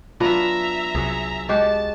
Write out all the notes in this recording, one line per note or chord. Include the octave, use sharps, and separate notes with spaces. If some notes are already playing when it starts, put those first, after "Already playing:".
F#3 B3 D4 F4 E5 A#5
C2 F#3 G#4
G#3 F#4 G4 A5